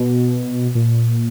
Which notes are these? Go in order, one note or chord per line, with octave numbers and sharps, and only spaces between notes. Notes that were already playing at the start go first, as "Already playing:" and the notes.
Already playing: B2
A#2